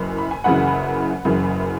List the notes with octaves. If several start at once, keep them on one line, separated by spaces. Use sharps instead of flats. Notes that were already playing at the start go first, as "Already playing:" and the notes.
Already playing: F#1 F#2 E3
B5
G#5
F#1 F#2 C#3 E3 F#5 B5
F#1 F#2 C#3 E3